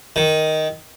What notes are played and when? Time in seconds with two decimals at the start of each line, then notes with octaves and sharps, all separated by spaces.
0.16 D#3